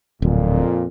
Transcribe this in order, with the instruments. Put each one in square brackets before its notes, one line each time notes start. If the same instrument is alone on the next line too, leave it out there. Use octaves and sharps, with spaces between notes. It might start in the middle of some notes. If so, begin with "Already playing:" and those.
[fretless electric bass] D1 [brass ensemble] F2 A#2